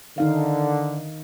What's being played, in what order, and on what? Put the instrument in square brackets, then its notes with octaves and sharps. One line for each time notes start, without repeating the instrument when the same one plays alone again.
[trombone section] D3 [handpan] D#3 D#4 F5